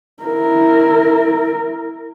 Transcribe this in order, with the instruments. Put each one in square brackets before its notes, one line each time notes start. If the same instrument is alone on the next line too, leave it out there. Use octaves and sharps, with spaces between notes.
[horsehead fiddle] E4 A#4